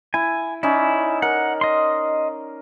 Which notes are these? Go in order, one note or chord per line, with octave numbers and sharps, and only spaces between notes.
E4 G#5
C#4 D#4 E4 D5
A#4 F#5
D#5 C6